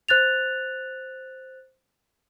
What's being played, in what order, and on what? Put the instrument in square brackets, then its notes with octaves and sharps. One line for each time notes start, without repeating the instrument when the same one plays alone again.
[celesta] C5 F#6 A6 F7